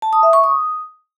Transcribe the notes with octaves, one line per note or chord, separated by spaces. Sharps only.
A5
D#6
E5
C#6
D#6